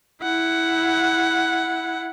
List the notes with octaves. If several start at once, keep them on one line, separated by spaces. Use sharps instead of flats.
E4 F#5